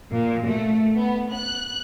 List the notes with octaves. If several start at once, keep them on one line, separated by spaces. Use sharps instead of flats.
A#2
A3
B3
F#6